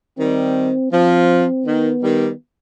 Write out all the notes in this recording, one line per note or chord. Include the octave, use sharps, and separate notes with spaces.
D#3 G3 C4
F3 C4
D#3 B3
D#3 G3